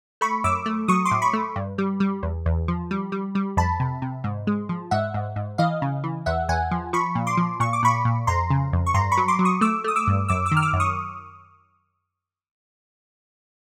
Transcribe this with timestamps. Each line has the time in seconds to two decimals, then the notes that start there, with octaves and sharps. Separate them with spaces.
0.21 A3 B5 C#6
0.44 F#2 D6 E6
0.66 A3
0.88 F#3 C#6 D#6
1.05 C6 D6
1.11 A2
1.22 B5 C#6
1.33 A3
1.56 G2
1.78 G3
2.00 G3
2.23 E2
2.46 E2
2.68 F3
2.91 G3
3.12 G3
3.35 G3
3.57 F2 A5 B5
3.80 C3
4.02 C3
4.24 G#2
4.47 G#3
4.69 F3
4.91 G#2 E5 F#5
5.14 G#2
5.36 G#2
5.58 E3 D#5 F5
5.82 C#3
6.04 E3
6.26 E2 E5 F#5
6.49 E2 F#5 G#5
6.71 F3
6.93 F3 B5 C#6
7.15 A#2
7.27 C6 D6
7.37 F3
7.60 A#2 C#6
7.73 D6
7.83 A#2 B5 C#6
8.05 A#2
8.27 F2 A#5 C6
8.50 C#3
8.73 F2
8.86 C#6
8.94 G2 A#5 C6
9.12 B5 C#6
9.17 F#3
9.28 C6 D6
9.39 F#3
9.45 C#6 D#6
9.61 A3 D6 E6
9.84 A3 D#6
9.96 D6 E6
10.07 G2
10.28 F#2 D6 E6
10.46 D6 E6
10.52 D#3
10.57 F6
10.62 D6 E6
10.73 F#2
10.80 C#6 D#6